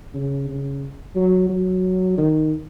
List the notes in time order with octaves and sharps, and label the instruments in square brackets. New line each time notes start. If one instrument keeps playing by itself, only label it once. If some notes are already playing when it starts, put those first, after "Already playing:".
[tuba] C#3
C#3
F#3
F#3
D#3